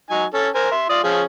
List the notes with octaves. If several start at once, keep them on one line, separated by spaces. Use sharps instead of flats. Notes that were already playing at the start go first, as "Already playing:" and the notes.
F#3 D#4 G#5
C#4 A4
A#4 C5 G#5
E5 C6
F4 D5 D#6
F3 C#4 G#4